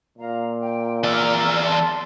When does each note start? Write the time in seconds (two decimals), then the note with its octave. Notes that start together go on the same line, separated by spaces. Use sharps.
0.18 A#2 F5 A#5
0.60 G5
1.04 E2 D5 A#5 E6 F6
1.66 A5 C6